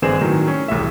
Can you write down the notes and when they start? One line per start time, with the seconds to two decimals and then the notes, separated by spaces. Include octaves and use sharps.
0.02 G#1 G2 C4 G#4 B4 E7
0.21 A2 D#3 F#3
0.47 C#4
0.68 E1 C2 A2 E5